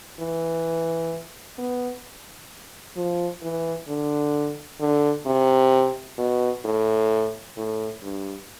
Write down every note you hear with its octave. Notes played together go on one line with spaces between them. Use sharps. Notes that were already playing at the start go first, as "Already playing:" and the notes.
E3
B3
F3
E3
D3
D3
C3
B2
A2
A2
G2